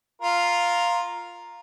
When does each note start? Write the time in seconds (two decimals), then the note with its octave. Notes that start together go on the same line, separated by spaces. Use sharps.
0.21 F4 A#4